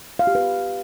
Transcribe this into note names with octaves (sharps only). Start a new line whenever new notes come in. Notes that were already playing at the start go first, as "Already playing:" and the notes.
F5
G4
B4